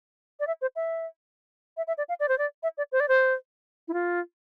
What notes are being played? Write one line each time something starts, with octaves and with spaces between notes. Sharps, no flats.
D5
E5
C5
E5
E5
E5
D5
F5
D5
C5
D5
E5
D5
C5
D5
C5
E4
F4